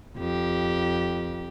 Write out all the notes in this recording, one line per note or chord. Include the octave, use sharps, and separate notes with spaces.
F2 G4